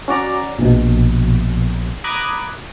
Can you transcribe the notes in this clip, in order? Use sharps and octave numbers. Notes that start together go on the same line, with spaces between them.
C#4 F#4 D5 A#5
A#1 B2
A#5 B5 D6 D#6 F#6 G#6